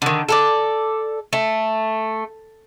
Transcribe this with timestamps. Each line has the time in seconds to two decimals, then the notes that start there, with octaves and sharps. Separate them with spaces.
0.02 D3 D#3
0.29 A4 A#4 D5
1.33 A3